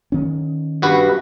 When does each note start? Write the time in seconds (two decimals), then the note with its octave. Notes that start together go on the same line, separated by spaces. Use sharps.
0.12 D#3 C#4
0.82 G2 F#4 B4